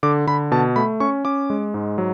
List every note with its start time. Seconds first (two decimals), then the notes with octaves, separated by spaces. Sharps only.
0.03 D3 D6
0.27 D3 B5
0.51 B2 A5
0.76 A3 B5
1.00 C#4 C#6
1.25 C#4 D6
1.50 G#3
1.74 G#2
1.98 F#3